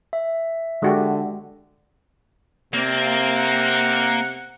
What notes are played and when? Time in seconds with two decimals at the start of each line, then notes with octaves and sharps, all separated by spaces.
0.13 E5
0.82 D3 G#3 F#4 G4
2.74 C3 A#3 C4 D5
3.36 F#5